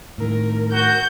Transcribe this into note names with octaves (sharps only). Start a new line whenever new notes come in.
A2 D#3 A#4
F#4 G6